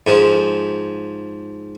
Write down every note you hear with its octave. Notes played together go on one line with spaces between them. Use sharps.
G#2 F3